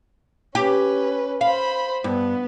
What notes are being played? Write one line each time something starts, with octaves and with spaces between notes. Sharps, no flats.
C#4 G4 B4
C5 F5 B5
G2 B3